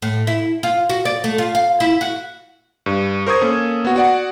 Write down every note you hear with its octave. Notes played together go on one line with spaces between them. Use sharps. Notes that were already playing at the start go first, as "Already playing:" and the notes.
A2
E4
F4
F#4
D5
A3
F4
F5
E4
F#4
G2
A#4 C5 C#6 D#6 G#6
A#3 C#4 A4
B3 F#4
F#4 D5 F#5